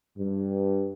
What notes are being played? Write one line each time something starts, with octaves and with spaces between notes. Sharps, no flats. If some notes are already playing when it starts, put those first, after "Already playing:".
G2